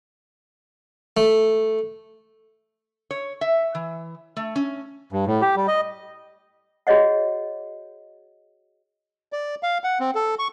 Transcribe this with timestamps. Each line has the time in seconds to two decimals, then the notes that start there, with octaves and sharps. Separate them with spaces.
1.17 A3
3.11 C#5
3.41 E5
3.75 E3
4.37 A3
4.56 C#4
5.13 G2
5.27 A2
5.42 G4
5.56 G3
5.68 D#5
6.87 F#4 G#4 C#5 D#5 F#5
9.33 D5
9.63 F5
9.84 F#5
10.00 C4
10.15 A4
10.39 C#6